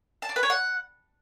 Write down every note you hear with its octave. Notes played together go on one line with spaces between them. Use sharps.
A5
D5
B4
C#5
F#5